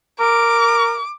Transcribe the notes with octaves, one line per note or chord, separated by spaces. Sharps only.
A#4 D6